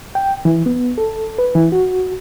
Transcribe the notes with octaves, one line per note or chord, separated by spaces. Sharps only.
G5
E3
B3
A4
B4
E3
F#4